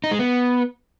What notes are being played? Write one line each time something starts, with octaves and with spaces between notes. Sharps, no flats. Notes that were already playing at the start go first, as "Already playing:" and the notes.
D#4
G#3
B3